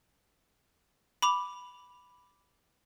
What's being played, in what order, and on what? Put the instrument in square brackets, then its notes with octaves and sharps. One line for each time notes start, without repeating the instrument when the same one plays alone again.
[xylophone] B5 D6 F7